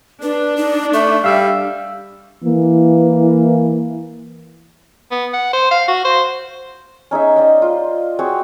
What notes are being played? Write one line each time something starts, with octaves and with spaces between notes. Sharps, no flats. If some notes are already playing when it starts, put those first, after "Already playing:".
D4 B4
D#4
A3 E5
G3 F5 E6
E3 A#3
B3
F#5
C5
F5
F#4
C5
C#4 D#4 G#4 E5
D5 D#5 G5
F4
C4 F#4 G#4 C#5